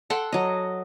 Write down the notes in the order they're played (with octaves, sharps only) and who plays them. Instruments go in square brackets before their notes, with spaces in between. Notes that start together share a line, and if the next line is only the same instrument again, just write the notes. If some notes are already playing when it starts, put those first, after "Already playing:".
[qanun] A4 F#5 G5 C6
F#3 D#5